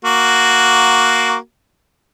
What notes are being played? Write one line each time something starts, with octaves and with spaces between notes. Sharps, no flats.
A#3 F#4